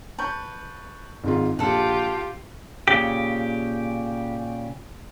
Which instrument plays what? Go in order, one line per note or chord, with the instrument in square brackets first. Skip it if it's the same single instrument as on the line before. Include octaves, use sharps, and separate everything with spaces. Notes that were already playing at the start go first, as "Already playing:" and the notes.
[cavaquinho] B4 [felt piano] A5 C#6 G6
[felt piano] G#1 G#2 F4
[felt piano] A#1 [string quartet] F4 G4 [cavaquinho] A4 F#5
[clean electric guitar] A#2 C#3 G4